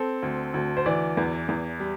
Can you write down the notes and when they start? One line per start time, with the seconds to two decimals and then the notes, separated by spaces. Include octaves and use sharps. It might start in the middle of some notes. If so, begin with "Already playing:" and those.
Already playing: C4 A4
0.23 D2
0.54 D2
0.77 C5
0.86 E3 D5
1.17 E2
1.48 E2
1.80 G3